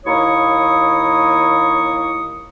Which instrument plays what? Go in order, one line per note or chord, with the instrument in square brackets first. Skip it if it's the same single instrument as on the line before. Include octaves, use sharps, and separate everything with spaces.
[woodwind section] D#2 A#3 E4 C#5 C#6 D#6